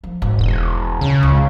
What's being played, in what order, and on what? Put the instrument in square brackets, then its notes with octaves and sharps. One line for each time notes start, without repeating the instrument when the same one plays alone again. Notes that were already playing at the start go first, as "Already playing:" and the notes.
[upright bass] F3
G#1
[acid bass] E1 [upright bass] D#2
[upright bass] D#2 [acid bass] C#3
[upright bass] C#2